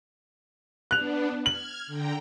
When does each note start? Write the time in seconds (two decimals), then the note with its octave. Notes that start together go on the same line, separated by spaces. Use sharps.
0.91 B3 D4 F#6 F7
1.46 F6 G#6 F#7
1.87 D3 G5 A#5